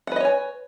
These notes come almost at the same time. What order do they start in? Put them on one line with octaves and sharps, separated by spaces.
F#5 B4 D#5 C#5 G#5